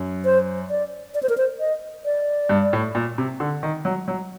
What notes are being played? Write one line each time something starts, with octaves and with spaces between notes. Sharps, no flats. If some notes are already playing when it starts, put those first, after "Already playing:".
Already playing: F#2
C5
D5
D5
C5
A#4
C5
D#5
D5
G2
A2
A#2
C3
D3
D#3
F#3
F#3